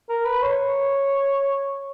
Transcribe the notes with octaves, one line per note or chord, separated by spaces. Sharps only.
A#4
B4
C#5